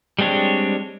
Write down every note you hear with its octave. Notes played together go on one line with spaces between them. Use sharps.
G3 G#3 C4 D4 C#5